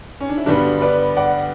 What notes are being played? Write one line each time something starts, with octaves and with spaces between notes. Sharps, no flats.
C#4
D4
E4
G2 D3 G3 B3 D4 F#4
B4 D5
D5 F#5